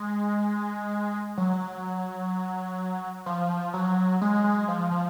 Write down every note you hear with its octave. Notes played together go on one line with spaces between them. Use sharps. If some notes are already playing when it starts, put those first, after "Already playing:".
Already playing: G#3
F#3
F3
F#3
G#3
G#3
F3
F3